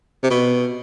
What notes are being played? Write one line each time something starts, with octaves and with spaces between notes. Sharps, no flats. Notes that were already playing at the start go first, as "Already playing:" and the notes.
C3
B2